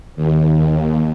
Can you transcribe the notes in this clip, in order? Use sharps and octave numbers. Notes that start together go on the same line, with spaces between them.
D#2